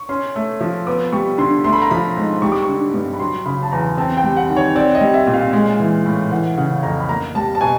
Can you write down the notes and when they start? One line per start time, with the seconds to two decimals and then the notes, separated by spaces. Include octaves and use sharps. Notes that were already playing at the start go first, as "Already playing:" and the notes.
Already playing: C#6
0.09 C#4 C6
0.36 A3
0.61 F3
0.87 B3 D6
1.12 G3 C#6
1.38 D3 C6
1.64 A3 C6
1.73 B5
1.82 A#5
1.91 F3 B5
2.17 G#2
2.42 G3 C#6
2.52 D6
2.62 C#6
2.69 D3
2.94 G2
3.13 B5
3.20 F#3 C6
3.45 C#3 B5
3.63 A5
3.72 E2 A#5
3.98 C4 A5
4.17 G5
4.24 G3
4.36 F#5
4.49 D#3
4.57 C#5
4.75 C4 D5
4.95 D#5
5.01 G3
5.14 E5
5.27 A#2
5.34 F5
5.53 G#3
5.80 E3
6.06 A2
6.31 E3 F#5
6.57 C#3 F#5
6.83 F2 A#5
7.00 B5
7.09 A#3 A#5
7.35 G3 A5
7.55 A5
7.61 B2 G#5